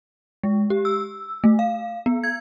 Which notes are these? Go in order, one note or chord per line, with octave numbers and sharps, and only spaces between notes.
G#3
G4
E6
A3
F5
B3
G#6